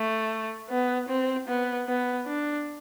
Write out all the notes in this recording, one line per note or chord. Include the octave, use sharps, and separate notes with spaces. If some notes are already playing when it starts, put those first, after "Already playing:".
Already playing: A3
B3
C4
B3
B3
D4